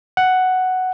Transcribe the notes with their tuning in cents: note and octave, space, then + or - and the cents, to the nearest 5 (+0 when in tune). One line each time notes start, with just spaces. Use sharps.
F#5 +5